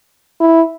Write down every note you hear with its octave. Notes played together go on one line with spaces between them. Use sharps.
E4